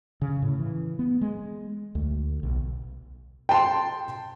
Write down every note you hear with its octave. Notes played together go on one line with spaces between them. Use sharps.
C#3
A2
E3
B3
G#3
D2
B1
G5 A5 C6